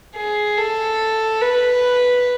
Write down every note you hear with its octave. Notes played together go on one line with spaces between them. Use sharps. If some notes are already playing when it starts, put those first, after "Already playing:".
G#4
A4
B4